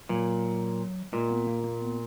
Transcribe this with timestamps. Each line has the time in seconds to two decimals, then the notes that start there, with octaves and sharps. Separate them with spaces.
0.09 A#2 F#3
1.13 A#2 G#3
1.30 B3
1.47 A#3
1.64 A#3
1.81 B3